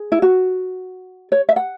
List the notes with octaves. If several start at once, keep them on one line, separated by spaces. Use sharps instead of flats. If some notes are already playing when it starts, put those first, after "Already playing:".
Already playing: G#4
E4
F#4
C#5
E5
F#5